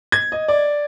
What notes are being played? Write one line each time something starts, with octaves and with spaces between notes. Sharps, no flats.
G#6
D#5
D5